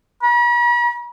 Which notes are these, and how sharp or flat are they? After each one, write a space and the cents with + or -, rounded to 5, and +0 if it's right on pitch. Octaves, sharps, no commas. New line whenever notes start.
B5 -45